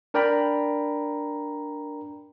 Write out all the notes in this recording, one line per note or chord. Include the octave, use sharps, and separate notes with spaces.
D4 A#4 D5 G5 A#5 B5